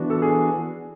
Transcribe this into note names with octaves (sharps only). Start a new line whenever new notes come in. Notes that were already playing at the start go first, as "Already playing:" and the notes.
Already playing: E3 B3 D4 F#4
A4
G#4